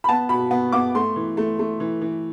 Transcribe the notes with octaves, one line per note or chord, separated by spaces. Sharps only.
B5
B3 A5
B2 B5
B3
B3 D6
A3 C6
E3
A3
A3
E3
E3